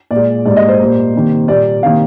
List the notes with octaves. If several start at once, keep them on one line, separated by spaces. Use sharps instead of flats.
A#2 D5
G#3
G#2 G3 A#3 D5
D#5
C5
A#2 G3 A#3
C3 D#3 A#3
A#2 G3 A#3 D5
C3 D#3 A#3 F5